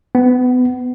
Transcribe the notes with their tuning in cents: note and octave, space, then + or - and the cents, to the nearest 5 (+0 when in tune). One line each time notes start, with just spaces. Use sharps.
B3 +25